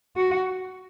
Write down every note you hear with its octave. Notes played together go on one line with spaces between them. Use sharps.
F#4